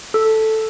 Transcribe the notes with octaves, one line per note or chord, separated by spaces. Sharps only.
A4